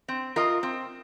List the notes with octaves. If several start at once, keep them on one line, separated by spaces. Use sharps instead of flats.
C4
F4 A#4 D#5
C4